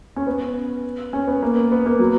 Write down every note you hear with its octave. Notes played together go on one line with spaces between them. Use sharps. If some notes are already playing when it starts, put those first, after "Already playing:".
C#4
B3
C#4
B3
A#3
B3
A#3
F#3